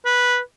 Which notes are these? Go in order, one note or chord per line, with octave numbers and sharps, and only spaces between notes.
B4